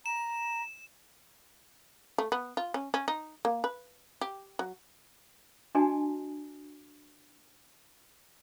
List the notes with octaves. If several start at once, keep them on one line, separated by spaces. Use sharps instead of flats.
A#5 E7
A3
B3
F4
C#4
C#4
D#4
A#3
B4
G4
F#3
D4 F#4 D#5 G#5 A5